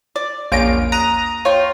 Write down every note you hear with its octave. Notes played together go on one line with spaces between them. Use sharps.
D5
A#1 E2 A#3 C#4 F4 D7
A#5 D#6 F#6
F4 C#5 G5